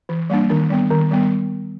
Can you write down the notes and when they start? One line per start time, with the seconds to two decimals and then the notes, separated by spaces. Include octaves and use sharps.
0.09 E3
0.30 G3 A#3 D4
0.50 D#3 D4
0.70 G3 B3
0.90 D#3
1.11 G3 B3